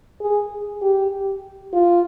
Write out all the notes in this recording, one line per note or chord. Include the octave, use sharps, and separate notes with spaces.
G#4
G4
F4